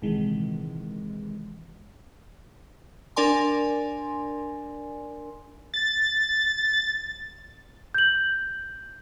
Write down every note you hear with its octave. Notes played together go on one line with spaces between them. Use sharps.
A#1 C3 D#3 E3 G#3
D4 A#4 D5 G#5 C6
A6
G6 F#7